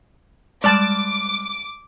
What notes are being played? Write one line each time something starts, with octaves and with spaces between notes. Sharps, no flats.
G3 G#3 D5 A5 D6